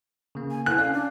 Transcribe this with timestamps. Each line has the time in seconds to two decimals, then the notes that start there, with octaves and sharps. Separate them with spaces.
0.35 C#3 A#3
0.51 G#5
0.66 A4 G#5 F#6
0.78 C#4 D5 F5
0.93 D4